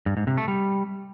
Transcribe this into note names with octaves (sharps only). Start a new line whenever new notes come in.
G2
G#2
C3
A3
G3